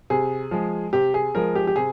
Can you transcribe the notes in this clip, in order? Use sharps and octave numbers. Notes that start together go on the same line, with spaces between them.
C3 G#4
F3 G#3
C3 G4
G#4
F3 G#3 A#4
G4
G4
C3 G#4